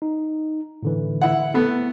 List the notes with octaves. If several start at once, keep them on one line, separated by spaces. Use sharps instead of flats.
D#4
A2 D3 E3
E4 F#5
A3 B3 C4